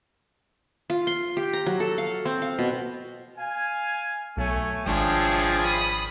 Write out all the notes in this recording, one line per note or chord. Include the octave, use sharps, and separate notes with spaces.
F4
C6
G4
A#5
F#3
A4
F5
C4
F5
B2
F5 G#5
B1 A3 C#5 G#5
G#1 F3 D4 G#4 C#5 D5 E5 G5
B5 D#6